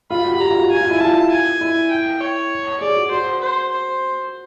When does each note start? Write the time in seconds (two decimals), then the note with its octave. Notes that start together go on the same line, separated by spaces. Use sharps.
0.10 F4 B5
0.26 F#4
0.34 G4
0.40 F#4 A#5
0.51 F4
0.61 F#4
0.71 F#4 G#5
0.81 F4
0.91 E4
1.00 F4 A5
1.31 G#5
1.61 E4
1.91 G5
2.21 C#5
2.81 G#4 D5
2.96 F#4
3.11 F#4 C5
3.41 C5
3.72 C5